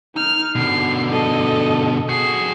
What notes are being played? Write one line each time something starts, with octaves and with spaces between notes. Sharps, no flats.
D#4 F6
B2 D3 C7
A4 D#5
F#4 G#4 C7